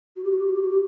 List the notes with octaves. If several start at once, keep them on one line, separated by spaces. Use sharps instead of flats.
F#4
G4
F#4
G4
F#4
G4
F#4
G4